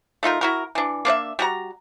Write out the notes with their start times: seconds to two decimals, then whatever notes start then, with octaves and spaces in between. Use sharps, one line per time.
0.23 A3 D#4 F4 A#4
0.41 E4 F#4 A#4
0.75 E3 D4
1.05 A#3 D4 C#5 E5
1.39 G3 F#4 A#5